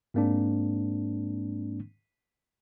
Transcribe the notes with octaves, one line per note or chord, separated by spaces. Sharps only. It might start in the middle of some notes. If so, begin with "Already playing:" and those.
G#2 G#3 A#3 C4 D4